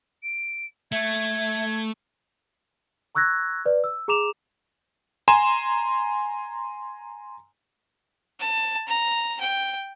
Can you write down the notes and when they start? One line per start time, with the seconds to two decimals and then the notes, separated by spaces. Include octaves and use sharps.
0.23 D7
0.92 A3 E5 G#6
3.15 A#5 C#6 E6 F#6 G#6 A#6
3.66 B4 D5
3.84 E6
4.08 G#4 A#5 D6 E7 F7
5.28 G#5 A#5 C6 E7
8.40 A5
8.88 A#5
9.40 G5